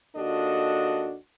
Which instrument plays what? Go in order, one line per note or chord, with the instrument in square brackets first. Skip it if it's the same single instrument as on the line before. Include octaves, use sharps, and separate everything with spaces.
[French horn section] D#2 D4 F#4 A4 D#5